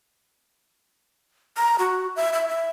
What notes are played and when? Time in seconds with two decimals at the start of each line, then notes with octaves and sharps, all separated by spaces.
1.57 A#5
1.79 F#4
2.16 E5
2.33 E5
2.48 E5